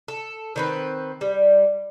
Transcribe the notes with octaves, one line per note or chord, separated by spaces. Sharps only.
A4
D#3 C4 B4
G3